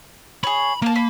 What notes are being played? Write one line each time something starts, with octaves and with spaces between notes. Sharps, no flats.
G#4 C#5 B5
A#3 A#4 A5
B5